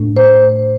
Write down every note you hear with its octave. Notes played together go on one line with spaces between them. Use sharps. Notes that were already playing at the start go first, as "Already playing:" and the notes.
Already playing: A2 A3 D4
C5